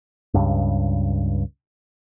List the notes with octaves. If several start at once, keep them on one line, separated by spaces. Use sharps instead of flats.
C#2 G2